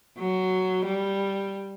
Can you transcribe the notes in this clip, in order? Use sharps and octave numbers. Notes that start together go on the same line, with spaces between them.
F#3
G3